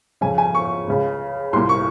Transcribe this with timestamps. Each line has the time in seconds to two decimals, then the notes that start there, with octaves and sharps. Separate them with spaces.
0.21 F2 C#3 G#5
0.38 G#5
0.55 C#6
0.87 C#2 C#3
1.53 C2 C6
1.56 A#2
1.69 C#6